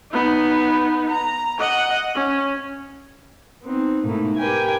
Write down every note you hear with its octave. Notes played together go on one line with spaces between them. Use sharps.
B3 D#4
A#5
D#5 F#5
C#4
B3 C4 D#4
G#2 B2 A3 A#3 D#4 E4
G4 A#4 B4 G5 G#5